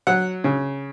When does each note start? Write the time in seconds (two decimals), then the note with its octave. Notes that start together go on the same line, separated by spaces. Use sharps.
0.07 F#3 F#5
0.44 C#3